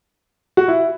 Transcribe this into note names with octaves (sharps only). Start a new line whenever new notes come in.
F#4
E4